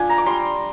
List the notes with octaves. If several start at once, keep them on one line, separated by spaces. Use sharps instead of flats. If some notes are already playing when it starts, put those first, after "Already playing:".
Already playing: F3 D4 G#5
A#5
D6
G3 C6